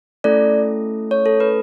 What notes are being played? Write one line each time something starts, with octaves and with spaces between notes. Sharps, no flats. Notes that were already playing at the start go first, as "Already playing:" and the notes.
A3 C#4 E4 A4 D5
C#5
A4
B4